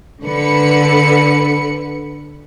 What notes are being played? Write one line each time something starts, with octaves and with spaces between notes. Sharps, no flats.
D3 B4 C#7